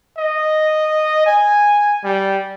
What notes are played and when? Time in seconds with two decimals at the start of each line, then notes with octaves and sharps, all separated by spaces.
0.18 D#5
1.27 G#5
2.04 G3